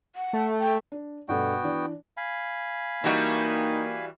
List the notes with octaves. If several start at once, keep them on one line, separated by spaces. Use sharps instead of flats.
F#5
A3
G5
D4
G2 B2 A3 B3 F#4 G5
E3 D4
F5 G#5 B5
E3 G3 A#3 D#4 F#4